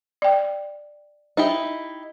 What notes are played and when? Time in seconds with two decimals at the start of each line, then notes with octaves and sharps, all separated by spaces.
0.22 D5 G5
1.37 D#4 E4 G4